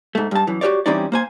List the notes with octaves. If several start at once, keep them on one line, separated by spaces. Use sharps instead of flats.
G#2 A3
G2 A5
F#2 E3
F#4 G4 B4 C#5 D5
E3 G3 C4 C#4 D#4 D5
A#3 C5 G#5